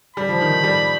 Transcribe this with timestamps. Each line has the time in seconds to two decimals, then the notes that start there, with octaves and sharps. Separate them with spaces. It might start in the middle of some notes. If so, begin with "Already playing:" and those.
0.16 G3 B5
0.29 F3
0.41 D#3
0.52 D#3
0.64 G3